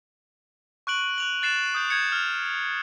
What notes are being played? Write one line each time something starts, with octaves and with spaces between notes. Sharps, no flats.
C#6 F#6 D7 F#7
F#6 F7 F#7
F#6 A6 C7 E7
D#6 G6 D7
G6 G#6 C#7
F6